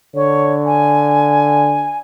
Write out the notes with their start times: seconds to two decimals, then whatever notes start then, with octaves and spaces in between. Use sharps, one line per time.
0.15 D3 C#5
0.66 G#5